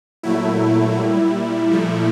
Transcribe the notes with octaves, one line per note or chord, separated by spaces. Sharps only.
A#2 F#3 A3 E4
A#2 G3
A#2 F3 A3